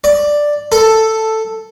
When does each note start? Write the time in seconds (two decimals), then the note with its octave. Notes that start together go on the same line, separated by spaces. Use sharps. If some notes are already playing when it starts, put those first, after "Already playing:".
0.04 D5
0.72 A4